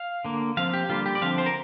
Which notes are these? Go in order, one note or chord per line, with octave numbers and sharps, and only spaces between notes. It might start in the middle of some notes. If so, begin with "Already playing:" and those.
Already playing: F5
D3 A#3
F3 C4 F5
G4
D3 G3 A#3 F4
G4
D5
D3 F3 C4 F5
C5
A#4